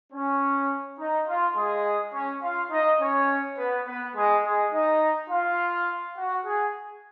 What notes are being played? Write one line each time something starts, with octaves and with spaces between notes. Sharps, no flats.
C#4
D#4
F4
G#3 G#4
C#4 C#5
F4 F5
D#4 D#5
C#4 C#5
B3 B4
B3 B4
G#3 G#4
G#3 G#4
D#4 D#5
F4 F5
F#4 F#5
G#4 G#5